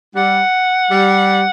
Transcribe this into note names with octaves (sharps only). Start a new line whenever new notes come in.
G3 F#5
G3